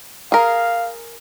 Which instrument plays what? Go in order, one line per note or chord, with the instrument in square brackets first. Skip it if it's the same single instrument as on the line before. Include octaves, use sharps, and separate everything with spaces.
[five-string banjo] G#4 A#4 [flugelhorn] F5